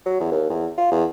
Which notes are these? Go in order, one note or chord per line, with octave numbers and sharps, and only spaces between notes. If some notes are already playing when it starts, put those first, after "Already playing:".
F#3
E2
D#2
E2
F4
E2